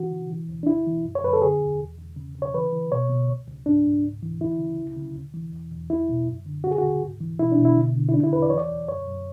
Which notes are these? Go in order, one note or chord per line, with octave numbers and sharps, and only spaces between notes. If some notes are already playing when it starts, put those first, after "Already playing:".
Already playing: E3 F#4
C#3
E3
D2
D4
D2 E4
E3
F#2
C#5
F#2 B4
A4
D3 G#4
E2
E2
E2
C#3
C#3
C#5
E3 B4
E3
B2 C#5
B2
C#2
C#2
G#2 D4
G#2
C#2
E3
D2 E4
C#3
C#2
C#3
D2
E3
E2
E2
C#2 E4
B2
F#2
D3
C#3 F#4
G#4
F#4
D2
G#2
E3
B2 E4
D4
B2
E4
D3
D3
E4
C#3 D4
E4
E2 B4
D5
E3 C#5
D5
D2
F#2 C#5
F#2